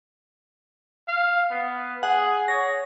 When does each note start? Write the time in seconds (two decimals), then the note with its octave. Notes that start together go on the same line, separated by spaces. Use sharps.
1.08 F5
1.51 B3
2.03 G#4 F#5
2.48 C#5 A#6